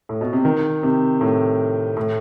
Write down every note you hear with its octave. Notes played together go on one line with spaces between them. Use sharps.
A2
B2
C3
D#3
C3
A2
A2